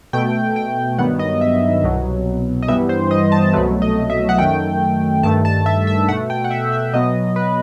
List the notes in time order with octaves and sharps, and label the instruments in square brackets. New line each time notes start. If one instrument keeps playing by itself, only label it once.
[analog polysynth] B2 A3 G5
G5
G2 D#3 F#3 B3 F#5
D#5
E5
C2 B2 F#3
D#5
G2 E3 G3 B3 E5
C5
D#5
A5
C2 B2 F#3 A3 B4
D#5
E5
F#5
F#2 D#3 A3 G5
G2 D#3 A3 A5
A5
E5
E5
B2 F#5
A3
G5
F#5
E5
E5
B2 F#3 B3 D#5
B4